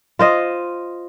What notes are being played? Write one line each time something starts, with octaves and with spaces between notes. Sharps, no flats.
F4 C5 D#5